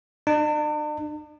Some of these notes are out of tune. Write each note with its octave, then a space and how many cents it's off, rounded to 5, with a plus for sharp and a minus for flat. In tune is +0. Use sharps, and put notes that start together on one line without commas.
D4 +45